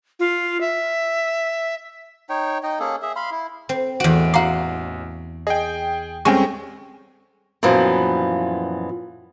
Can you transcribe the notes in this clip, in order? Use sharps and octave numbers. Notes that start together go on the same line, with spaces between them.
F4
E5
D#4 C#5 G5
D#4 D#5 G5
A#3 C#4 G#4 A4
G#4 E5
F5 B5 C6
E4
C4
A1 E2 F#4 D7
F#4 F5 A#5 C6 D6
G#4 D#5 G5
G3 G#3 C4 C#4 G5 G#5 C#6
F#2 A#2 E3 F3 B3